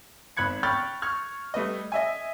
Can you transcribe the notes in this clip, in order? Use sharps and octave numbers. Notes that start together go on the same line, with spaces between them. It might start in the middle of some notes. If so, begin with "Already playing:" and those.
G#1 B5 F#6 G#6 C#7
G5 B5 C#6 F6 G6 A6
C#6 F6 G#6
G3 A3 B4 D#5
D#5 E5 G#5